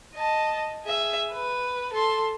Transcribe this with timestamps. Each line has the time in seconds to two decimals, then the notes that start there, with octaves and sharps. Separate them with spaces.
0.15 D#5 A5
0.84 G#4 E5
1.32 B4
1.93 A4 C6